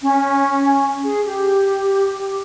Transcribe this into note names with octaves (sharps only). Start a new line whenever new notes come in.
C#4
G#4
G4